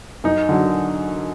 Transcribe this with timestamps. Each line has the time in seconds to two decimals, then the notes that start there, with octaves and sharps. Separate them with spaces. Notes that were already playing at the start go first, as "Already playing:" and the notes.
0.24 F#2 D#4
0.49 D3 F#3